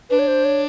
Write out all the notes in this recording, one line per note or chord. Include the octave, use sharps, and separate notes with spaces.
D4 B4
C#5
C5
C#5